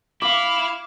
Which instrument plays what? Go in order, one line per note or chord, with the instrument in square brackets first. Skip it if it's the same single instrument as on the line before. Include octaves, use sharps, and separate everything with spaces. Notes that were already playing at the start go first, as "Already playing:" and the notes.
[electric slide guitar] E4 [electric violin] F5 [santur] D6